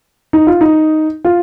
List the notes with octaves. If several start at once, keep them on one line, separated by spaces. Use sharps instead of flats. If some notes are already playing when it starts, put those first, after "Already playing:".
D#4
F4
D#4
F4